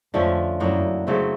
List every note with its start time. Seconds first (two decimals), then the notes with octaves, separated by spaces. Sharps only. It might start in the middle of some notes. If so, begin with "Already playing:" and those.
0.13 F2 D3 F3 A3 C#4
0.60 F#2 A2 F#3 A#3 D4
1.07 C#3 F#3 A3 C4